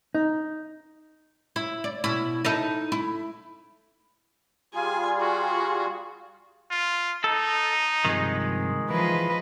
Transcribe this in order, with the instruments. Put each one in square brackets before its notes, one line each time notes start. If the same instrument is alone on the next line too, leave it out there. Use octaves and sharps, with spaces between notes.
[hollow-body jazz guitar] D#4
[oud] E4
D5
B2 E4
D#4 E4 A4
E4
[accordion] G3 F4 G#4 [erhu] G#5
[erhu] F#4
[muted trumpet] F4
[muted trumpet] D#4 [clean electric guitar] A4
[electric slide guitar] G2 C3 F3 [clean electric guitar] D#3 G#3
[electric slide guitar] E3 E4 G#4 [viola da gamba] F3 B4 D#5